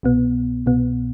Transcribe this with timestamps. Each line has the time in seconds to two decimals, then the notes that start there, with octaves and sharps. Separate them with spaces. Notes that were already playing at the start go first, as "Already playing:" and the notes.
0.03 C2 B2 B3
0.66 C2 B2 B3